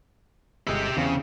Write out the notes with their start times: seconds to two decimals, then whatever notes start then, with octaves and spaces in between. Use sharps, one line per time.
0.67 G1 G#3 G4 D#5 E5
0.97 E2 C#3 C4